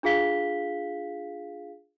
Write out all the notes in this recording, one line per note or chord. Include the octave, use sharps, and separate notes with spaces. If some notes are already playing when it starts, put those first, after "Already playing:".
D4 F4 G#4 F5 B6 G7